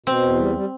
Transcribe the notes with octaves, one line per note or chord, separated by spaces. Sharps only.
B2 C4
E2
G3
G3